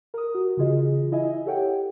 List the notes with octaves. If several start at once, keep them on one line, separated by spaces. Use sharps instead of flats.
A#4 D#6
F#4
C#3 E3 F4 G#4 D#5
E4 D#5 E5 G#5
G4 A4 C#5 F#5 G5